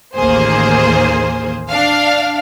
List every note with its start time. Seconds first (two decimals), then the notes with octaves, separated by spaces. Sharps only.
0.15 A1 D#2 A#3 G#4 C5
1.70 D4 F5